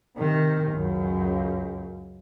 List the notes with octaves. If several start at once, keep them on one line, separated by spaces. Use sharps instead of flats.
C3 D#3
C#2 F#2